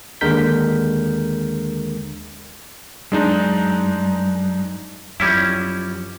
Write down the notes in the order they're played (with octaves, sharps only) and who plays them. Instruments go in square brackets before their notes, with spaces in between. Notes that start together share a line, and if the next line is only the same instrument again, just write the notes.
[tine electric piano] D#2 D3 G#3 A#4 G6 B6
[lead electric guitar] F#2 [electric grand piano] G#3 D4 D#4
[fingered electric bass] F#2 F3 [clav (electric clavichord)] G3 C#4 E4